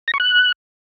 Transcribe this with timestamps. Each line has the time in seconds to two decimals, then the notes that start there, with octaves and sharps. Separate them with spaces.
0.08 A#6
0.14 C#6
0.20 F#6